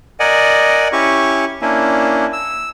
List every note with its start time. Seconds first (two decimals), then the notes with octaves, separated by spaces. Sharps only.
0.20 A#4 D5 D#5 F#5 G#5
0.92 C#4 E4 G4 C#6
1.62 A#3 C#4 D4 E4
2.33 E6